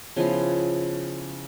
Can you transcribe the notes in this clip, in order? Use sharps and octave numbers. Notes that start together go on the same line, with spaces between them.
C#3 F3 B3 E4